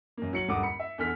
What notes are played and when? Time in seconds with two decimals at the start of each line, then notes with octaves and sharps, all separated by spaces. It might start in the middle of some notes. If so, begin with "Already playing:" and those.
0.17 F#2 A#3
0.33 F#3 C#7 F#7
0.48 D#1 G2 D3 F#5 D6 D#6
0.63 B5 C#7
0.80 E5
0.98 E2 D3 A4 F6 B6